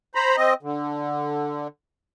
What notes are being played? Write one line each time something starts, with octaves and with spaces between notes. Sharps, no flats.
C5 A#5 B5
C4 D#5
D3